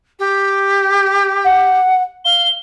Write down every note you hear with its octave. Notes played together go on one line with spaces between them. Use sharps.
G4
F#5
F5 G7